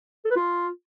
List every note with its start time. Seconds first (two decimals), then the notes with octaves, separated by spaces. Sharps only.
0.25 A4
0.30 B4
0.36 F4